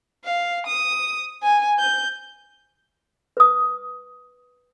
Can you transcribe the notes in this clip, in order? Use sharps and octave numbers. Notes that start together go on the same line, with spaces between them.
F5
D#6
G#5
G6
B4 D#6